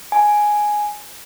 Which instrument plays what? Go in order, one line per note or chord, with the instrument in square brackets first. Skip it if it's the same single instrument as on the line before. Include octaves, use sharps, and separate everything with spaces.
[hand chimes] G#5